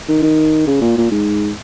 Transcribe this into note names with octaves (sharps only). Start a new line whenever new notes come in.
D#3
D#3
C#3
A#2
A#2
G#2